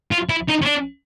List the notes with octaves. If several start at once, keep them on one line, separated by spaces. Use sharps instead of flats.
F4
E4
D#4
C#4
D4